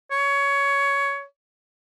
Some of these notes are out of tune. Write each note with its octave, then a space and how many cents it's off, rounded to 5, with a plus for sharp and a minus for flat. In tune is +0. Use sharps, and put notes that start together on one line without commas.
C#5 +15